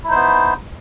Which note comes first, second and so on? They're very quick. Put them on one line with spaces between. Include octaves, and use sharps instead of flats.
E4 D#4 C5 B3